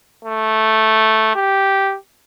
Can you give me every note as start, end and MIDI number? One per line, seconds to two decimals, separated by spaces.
0.24 1.35 57
1.36 1.96 67